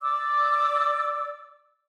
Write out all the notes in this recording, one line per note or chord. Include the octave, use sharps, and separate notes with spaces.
D5 D6 E6